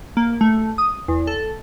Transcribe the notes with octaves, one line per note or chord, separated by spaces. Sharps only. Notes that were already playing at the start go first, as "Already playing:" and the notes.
A#3
A3
D#6
E2
A4